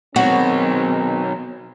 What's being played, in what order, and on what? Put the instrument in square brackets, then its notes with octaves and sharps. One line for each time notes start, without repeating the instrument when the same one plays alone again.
[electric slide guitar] B2 F#3 [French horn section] D#3 G#3 C4 [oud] F#4